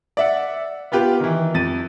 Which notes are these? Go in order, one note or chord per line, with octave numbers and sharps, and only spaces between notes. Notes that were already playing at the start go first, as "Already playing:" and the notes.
D5 E5 F#5
B3 F4 G4 B4
D#3 E3
F2 A6 D#7